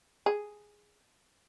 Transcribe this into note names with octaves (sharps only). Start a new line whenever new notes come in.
G#4